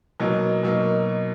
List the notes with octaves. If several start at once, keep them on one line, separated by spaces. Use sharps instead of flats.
B2 F#3 A#3 D#4
B2 F#3 A#3 D#4